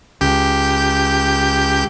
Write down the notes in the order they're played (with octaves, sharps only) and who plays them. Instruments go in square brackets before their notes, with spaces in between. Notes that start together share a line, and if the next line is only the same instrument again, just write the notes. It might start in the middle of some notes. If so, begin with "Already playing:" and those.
[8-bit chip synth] C#2 G4 G6